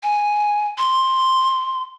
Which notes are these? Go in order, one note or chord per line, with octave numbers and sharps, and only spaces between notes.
G#5
C6